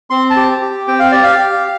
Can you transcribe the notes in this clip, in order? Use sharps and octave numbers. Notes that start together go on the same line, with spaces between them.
C4 C6
A5
G4
G4
C4 G5
F5
G4 D5
F5
G4